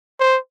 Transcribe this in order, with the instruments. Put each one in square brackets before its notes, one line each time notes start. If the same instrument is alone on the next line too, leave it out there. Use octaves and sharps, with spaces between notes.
[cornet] C5